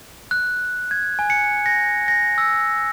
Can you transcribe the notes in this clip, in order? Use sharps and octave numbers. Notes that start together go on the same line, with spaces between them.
F#6
G#6
G#5
C#7
A#6
A#6
E6